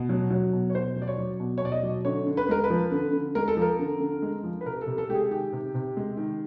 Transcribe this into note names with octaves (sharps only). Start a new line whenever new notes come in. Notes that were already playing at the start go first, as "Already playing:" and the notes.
Already playing: B2
F#3
F#3
B2
C#5
B2 C5
F#3
D5
C#5
F#3
B2
C#5
B2 D5
D#5
F#3
D3 C#5
D3
B4
G#3 A#4
B4
F3
D3
D3
G#3 A#4
A4
F3 A#4
D3
D3
G#3
F3
B4
C3 A#4
A4
C3
A4
G#3 G4
G#4
D#3 G4
C3
C3
G#3
D#3